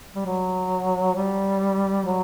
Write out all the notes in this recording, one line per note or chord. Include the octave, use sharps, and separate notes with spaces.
G3
F#3
G3
F#3